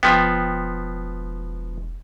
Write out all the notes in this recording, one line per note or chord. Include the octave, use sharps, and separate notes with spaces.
E1 F3 B3 G5